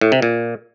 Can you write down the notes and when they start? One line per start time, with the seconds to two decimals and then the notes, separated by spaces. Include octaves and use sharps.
0.01 A2
0.12 C3
0.22 A#2